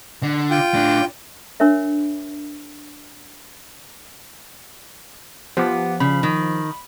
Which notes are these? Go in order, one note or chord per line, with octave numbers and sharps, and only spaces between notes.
D3
F4 G5
A2 D4
D4 A#4 C#5 E5
F3 B3 G4 F#5 D6
C#3 B5
D#3